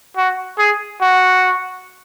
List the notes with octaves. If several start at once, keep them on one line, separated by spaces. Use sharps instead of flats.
F#4
G#4
F#4